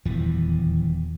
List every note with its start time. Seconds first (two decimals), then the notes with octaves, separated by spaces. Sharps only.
0.05 D#1 E2 E3 F3